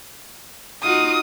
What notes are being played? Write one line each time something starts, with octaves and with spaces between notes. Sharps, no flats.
D#4 F4 F#4 D#6